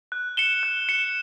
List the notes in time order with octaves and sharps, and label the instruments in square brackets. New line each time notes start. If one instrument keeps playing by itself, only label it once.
[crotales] F#6
C#7 E7 G7
F#6
C#7 E7 G7